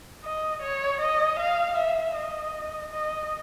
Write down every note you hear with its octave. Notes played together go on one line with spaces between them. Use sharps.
D#5
C#5
D#5
F5
E5
D#5
D#5